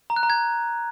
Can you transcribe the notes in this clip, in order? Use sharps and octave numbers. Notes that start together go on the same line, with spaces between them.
A#5
F#6
A#5
G#6